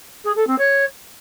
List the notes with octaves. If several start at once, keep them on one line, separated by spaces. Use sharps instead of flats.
G#4
A4
C4
C#5